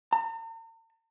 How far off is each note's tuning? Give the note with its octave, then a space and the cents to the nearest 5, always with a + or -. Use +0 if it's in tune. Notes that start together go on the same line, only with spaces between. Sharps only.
A#5 -45